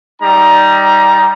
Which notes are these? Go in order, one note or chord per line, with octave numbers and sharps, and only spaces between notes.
G3 D#4 A#5